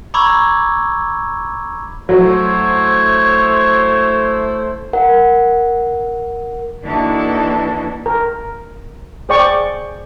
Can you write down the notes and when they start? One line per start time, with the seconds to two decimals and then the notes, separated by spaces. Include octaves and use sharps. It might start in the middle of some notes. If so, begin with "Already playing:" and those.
0.14 A#5 B5 C#6 D6 E6 G#6
2.09 F#3 A3 E4 C5 C#5
4.93 A#4 F#5
6.83 E3 A#3 D4 D#4 F#4 A4
8.06 A#4
9.29 G#4 C5 D5 G5 C#6